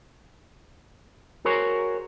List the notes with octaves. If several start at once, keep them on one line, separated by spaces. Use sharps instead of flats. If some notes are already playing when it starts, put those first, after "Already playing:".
F#4 G#4 A#4 C5 C#5